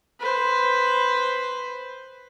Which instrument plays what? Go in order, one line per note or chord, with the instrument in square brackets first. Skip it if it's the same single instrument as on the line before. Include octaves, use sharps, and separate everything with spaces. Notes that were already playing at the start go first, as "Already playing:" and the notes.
[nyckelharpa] B4 C5